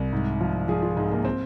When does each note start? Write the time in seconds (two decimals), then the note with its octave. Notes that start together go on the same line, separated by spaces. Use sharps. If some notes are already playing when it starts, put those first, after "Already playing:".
Already playing: C2
0.13 G#2
0.41 F3
0.68 F3 G#4
0.82 F4
0.97 G#2 G#3
1.12 A#3
1.25 C4